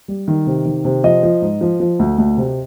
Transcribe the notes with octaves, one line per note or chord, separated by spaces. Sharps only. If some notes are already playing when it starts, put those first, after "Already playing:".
G3
D#3
C3
D#3
C3
F3 D#5
F3
G#2
F3
F3
D2
D2
C3